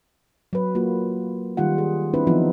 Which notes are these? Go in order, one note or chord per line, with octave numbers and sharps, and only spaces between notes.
F#3 B4
A#3 F4 F#4
D#3 G3 F4 F#5
G#4
C4 D4 E4 B4
E3 F3 B3 D#4